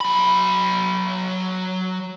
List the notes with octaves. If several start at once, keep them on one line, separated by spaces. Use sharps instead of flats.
F#3 B5